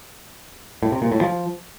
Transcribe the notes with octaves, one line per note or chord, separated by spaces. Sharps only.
A2
C3
A#2
A2
F3